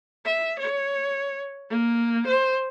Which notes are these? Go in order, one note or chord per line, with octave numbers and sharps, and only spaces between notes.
E5
C#5
A#3
C5